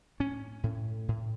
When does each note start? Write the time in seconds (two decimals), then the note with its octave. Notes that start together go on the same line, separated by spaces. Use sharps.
0.20 A2 C#4
0.63 A2
1.08 A2